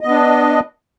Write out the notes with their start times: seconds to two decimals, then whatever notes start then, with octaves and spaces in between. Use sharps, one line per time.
0.01 D#5
0.05 B3
0.09 D4